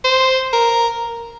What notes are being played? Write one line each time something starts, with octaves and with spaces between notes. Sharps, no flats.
C5
A#4